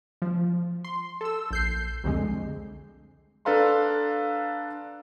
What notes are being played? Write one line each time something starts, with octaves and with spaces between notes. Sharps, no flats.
F3
C6
A4 E6
A#1 G6 C7
C2 F2 D3 G#3
D4 A4 B4 F5 A#5 C6